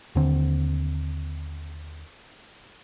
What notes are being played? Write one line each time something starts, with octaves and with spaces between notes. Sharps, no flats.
D#2 D3 C4